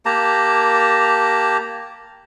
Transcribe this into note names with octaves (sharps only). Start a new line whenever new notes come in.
A#3 G4 A5 A#5